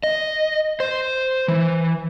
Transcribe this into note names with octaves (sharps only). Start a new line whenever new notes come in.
D#5
C5
E3